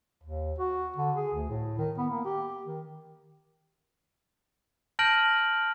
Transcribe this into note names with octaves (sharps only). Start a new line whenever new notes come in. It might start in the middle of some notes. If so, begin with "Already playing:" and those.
D#2
F#4
D3
G#4
D2
A2
D#3
B3
A#3
G4
D#3
A5 F6 G6 A#6 D7 F#7